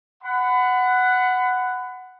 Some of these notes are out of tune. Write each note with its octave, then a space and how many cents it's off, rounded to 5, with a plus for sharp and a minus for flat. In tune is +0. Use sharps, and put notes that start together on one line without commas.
F#5 +0 B5 +30